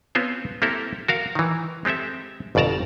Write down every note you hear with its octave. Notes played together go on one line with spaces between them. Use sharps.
B3 C4 F4 C5 C#5
A#3 C4 E4 G4 A4 A#4
F#4 A#4 F5
D#3 E3
G#3 C4 G4 A4 E5
G1 F2 B2 D5 A5 A#5